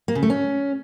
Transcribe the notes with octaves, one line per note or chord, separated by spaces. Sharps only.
A#3
C#3
A3
C#4